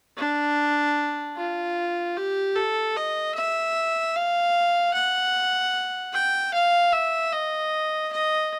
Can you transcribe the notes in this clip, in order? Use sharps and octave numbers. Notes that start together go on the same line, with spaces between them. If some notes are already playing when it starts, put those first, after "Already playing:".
D4
F4
G4
A4
D#5
E5
F5
F#5
G5
F5
E5
D#5
D#5